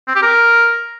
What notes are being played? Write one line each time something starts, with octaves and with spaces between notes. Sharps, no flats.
C4
G4
A#4